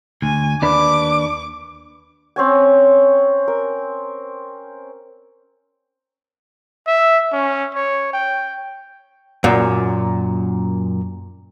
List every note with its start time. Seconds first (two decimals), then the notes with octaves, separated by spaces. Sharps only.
0.22 D2 G#5
0.62 D#2 D4 B4 D6
2.36 C4 C#4 G#5
3.48 A#4
6.87 E5
7.33 C#4
7.75 C#5
8.13 G5
9.44 F#2 A#2